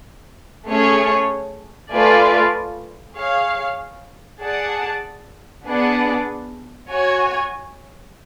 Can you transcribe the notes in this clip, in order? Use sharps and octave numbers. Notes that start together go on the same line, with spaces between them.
A3 C#4 G#4 C#5
A3 F4 B4 D5 G#5
G#4 C#5 F5
G#4 D5 F#5 A5
B3 D4 G#4 D5 F#5
F#4 C#5 G#5